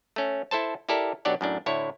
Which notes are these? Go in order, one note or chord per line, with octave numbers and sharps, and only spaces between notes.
A3 C#4
E4 A4 C5 A5
E4 G4 A4 A#4 D5
B1 F#3 D4 G4 D5 F#5
F#2 A2 D4
D2 A2 E4 C#5